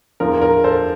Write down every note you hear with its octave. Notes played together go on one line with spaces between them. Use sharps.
E2 D3 F3 A#4
A#4
A4 C5